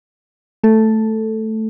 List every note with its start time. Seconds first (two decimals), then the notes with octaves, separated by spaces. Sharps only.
0.64 A3 A4